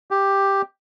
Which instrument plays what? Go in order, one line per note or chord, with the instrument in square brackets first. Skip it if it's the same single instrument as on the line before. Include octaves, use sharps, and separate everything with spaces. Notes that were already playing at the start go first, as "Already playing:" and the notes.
[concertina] G4